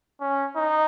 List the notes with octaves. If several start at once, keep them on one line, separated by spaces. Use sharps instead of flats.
C#4
D#4